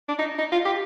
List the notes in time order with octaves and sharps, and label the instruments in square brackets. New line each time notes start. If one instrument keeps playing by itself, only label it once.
[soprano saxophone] D4
D#4
D#4
F4
G4